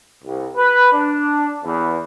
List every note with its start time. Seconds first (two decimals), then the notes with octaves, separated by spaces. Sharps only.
0.24 C2
0.57 B4
0.93 D4
1.64 E2